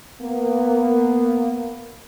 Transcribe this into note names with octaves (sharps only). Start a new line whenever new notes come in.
A#3 B3